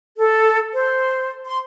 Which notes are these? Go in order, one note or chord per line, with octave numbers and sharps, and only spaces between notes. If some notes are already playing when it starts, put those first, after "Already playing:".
A4
C5
C6